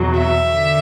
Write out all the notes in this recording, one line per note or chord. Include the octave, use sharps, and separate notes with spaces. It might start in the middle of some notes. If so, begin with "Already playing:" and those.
Already playing: E2 B2 F#3
E5
D3